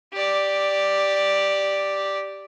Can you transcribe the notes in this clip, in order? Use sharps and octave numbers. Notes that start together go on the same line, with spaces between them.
G4 D5